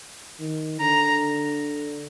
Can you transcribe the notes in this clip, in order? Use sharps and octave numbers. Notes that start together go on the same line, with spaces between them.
D#3
D3 A#5